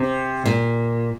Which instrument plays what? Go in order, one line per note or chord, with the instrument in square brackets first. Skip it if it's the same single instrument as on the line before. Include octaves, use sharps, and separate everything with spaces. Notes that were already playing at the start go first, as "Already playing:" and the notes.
Already playing: [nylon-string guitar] C3
A#2